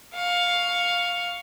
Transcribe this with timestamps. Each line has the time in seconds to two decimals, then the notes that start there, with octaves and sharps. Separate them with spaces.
0.14 F5 C#6